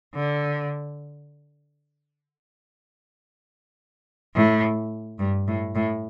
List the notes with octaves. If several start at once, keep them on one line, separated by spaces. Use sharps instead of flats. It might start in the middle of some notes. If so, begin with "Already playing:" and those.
D3
A2
G2
A2
A2